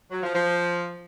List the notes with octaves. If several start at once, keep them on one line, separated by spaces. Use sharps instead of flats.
F#3
F3
F3